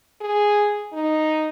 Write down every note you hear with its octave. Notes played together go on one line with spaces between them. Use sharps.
G#4
D#4